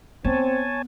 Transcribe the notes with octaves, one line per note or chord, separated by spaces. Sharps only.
B3 C4 C#5 G#5 A5